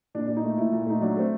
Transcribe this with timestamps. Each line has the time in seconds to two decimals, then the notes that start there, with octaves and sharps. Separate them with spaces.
0.15 A#2 D4
0.27 A#2 D4
0.37 D#4
0.44 A3
0.58 A#2 E4
0.72 A#2
0.86 A3 D#4
1.01 F#3 D4
1.17 A3 C4